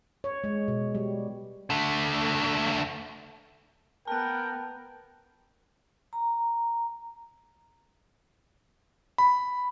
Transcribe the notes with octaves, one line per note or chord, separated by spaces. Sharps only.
C#5
G#3
B2
G3
D3 A3
B3 A#4 G5 A5 F#6
A#5
B5